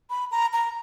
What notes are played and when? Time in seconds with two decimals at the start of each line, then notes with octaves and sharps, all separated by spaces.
0.10 B5
0.31 A#5
0.53 A#5